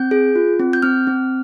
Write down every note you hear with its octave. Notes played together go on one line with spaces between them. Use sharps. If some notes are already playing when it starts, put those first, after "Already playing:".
Already playing: C4 G6
G#4
F4
C4
G6
C4 F6
C4